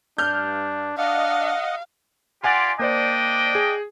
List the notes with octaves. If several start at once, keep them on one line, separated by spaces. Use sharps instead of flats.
G2 D4 F6 G6
D4 D#5 F5 F#5
F4 G4 D5 F#5 G#5 C6
A#3 D4 C5 D5 D#5 G5
G#4